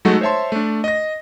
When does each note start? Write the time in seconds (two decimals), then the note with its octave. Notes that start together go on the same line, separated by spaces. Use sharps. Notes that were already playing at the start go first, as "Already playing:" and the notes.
0.05 F#3 G#3 A3 D#4 F#4 A4
0.21 C5 C#5 E5 A5 C6
0.52 A3 D4
0.84 D#5 A#6